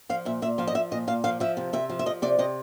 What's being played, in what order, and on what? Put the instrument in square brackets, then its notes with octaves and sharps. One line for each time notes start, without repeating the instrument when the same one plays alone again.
[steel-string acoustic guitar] F3 F5
A#2 E5
A#2 E5
F3 F5
D#5
F3 E5
A#2 D#5
A#2 F5
F3 F5
F3 E5
C3
C3 E5
F3
E5
F3 D#5
C3 D5
C3 D#5